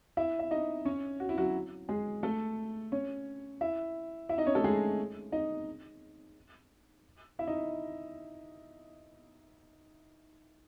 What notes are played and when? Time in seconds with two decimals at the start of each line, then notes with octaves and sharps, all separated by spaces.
0.17 E4 E5
0.39 E5
0.51 D#4 D#5
0.85 C#4 C#5
1.20 F#4
1.29 E4
1.37 F#3 F#4
1.89 G#3 G#4
2.23 A3 A4
2.92 C#4 C#5
3.61 E4 E5
4.29 E4 E5
4.38 D#4 D#5
4.47 C#4 C#5
4.55 A3 A4
4.64 G#3 G#4
5.32 D#4 D#5
7.39 E4 E5
7.47 D#4 D#5